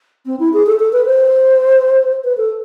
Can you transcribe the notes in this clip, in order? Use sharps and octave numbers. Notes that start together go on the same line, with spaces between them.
C4
E4
G#4
A4
A4
B4
C5
B4
A4